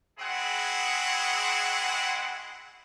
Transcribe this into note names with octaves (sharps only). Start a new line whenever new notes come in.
G#3 C4 E4 F#4 G#4 F#5